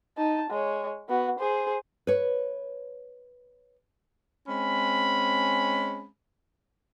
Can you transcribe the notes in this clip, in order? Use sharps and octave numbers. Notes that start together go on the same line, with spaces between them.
D#4 A5
G#3 C#5
B3 F#4
G#4 C5
B4 C#5
G#3 C4 C#4 B5